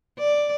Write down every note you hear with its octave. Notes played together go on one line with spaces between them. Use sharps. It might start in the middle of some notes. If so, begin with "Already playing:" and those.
D5